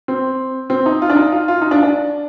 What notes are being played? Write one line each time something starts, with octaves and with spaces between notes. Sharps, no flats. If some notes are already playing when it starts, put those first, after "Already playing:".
C4
C4
D#4
F4
D4
D#4
F4
F4
D#4
D4
D4